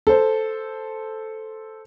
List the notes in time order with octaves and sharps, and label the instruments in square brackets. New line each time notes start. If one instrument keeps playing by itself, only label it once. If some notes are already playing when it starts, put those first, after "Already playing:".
[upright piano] A4 C5